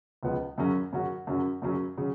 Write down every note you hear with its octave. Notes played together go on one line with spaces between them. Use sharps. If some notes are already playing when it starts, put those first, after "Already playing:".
C#2 C#3 F3 B3
F#2 C#3 F#3 C#4 F#4
F#2 C#3 F#3 C#4 F#4
F#2 C#3 F#3 C#4 F#4
F#2 C#3 F#3 C#4 F#4
C#3 F#3 C#4 G#4